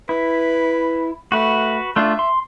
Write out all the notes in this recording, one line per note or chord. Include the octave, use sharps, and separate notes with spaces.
E4 B4
A3 F#4 B4
A3 D4 F4 E5
C6